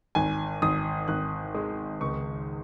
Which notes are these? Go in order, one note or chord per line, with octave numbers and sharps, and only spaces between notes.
G#1 G#5
G#1 D#6
G#1 F#6
G#3 D#6
C#2 C#6